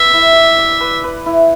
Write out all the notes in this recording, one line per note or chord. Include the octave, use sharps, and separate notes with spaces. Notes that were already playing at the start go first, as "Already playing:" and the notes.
Already playing: B4 E5
E4
D5
D5
B4
B4
E4